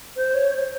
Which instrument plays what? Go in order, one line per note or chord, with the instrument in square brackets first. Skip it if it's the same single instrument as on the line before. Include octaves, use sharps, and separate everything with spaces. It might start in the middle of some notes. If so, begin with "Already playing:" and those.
[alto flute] C5
C#5
C5